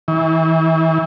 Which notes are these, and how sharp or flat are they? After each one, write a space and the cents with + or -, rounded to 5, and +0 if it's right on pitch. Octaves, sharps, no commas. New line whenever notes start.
E3 -35